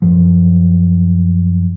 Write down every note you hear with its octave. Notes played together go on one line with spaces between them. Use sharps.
F#2 F3